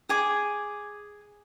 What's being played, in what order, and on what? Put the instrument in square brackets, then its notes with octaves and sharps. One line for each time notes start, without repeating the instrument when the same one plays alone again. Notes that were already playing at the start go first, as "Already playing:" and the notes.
[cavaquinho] G#4 G#5 D6